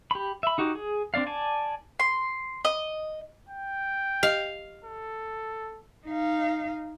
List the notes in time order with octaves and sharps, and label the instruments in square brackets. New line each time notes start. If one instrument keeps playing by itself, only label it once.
[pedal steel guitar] G4 B5
E5 B5
D#4 F#4 G4
G#4
C4 D4 D5 F5
D5 G#5 A5
[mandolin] C6
D#5
[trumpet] G5
[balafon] G4 D#5 [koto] F5
[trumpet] A4
[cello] D#4 F5